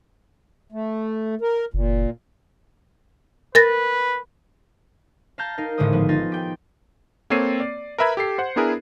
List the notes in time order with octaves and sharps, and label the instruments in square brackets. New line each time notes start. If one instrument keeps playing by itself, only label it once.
[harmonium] A3
A#4
[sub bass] F#1 [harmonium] A#2
[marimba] A#4 A6 A#6 [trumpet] B4
[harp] F5 A5 A#5 F6 G6
D#4 A#4 F5
G#1 A2 D3 G#3 C5 D#6
F3 B3
D#4 F4 G#5 A6
G4 G5
[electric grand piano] A#3 C4 A4 C#5 C7 D#7
D5
A#4 B4 E5 B5 G#6
G4 A4 C7
C5 F#5
B3 D4 E4 G#4 A#4 B4